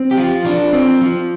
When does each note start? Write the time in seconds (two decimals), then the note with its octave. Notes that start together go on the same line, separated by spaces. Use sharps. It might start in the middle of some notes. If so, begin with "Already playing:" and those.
Already playing: C4
0.11 G4
0.17 F3 F4
0.45 F3 D4
0.73 C4
1.01 F3